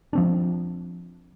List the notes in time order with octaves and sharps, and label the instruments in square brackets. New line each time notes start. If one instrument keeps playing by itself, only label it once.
[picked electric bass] F3 C4 D4